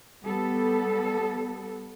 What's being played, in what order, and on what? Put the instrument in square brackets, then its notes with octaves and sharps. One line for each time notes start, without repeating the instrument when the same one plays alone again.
[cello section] G3 B3 A4